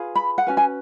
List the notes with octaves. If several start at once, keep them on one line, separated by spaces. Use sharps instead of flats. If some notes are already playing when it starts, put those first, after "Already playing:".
Already playing: F4 G#4 B4
B5
F#5
C#4 F#4 B4 G#5
G#5